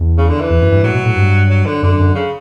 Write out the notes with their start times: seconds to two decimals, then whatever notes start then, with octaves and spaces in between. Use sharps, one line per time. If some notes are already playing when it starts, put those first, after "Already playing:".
Already playing: E2
0.17 C#3
0.28 D3
0.39 E3
0.50 E2
0.62 F#2
0.72 G2
0.83 A2 F#3
0.95 B2
1.05 A2
1.16 G2
1.50 F#3
1.66 D3
1.82 F#2 D3
1.99 F#2
2.15 C#3